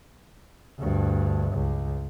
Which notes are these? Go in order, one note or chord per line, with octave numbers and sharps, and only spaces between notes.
D2 G2
C#2